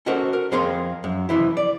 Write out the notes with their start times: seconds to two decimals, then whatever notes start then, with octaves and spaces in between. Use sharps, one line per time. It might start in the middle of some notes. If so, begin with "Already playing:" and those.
0.06 C#4 D#4 F#4 A4 A#4 C5
0.33 A#4
0.52 F2 C4 G#4 A#4 F5 C6
1.04 F#2
1.29 F2 C3 E3 E4
1.57 D5